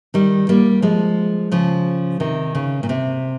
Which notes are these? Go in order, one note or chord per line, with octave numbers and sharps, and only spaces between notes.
D#3 G3
G3 A#3
F3 G#3
C#3 F3
C3 D#3
C#3
A#2
C3